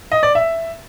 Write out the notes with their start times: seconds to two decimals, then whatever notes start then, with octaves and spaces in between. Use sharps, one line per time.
0.12 D#5
0.23 D5
0.35 E5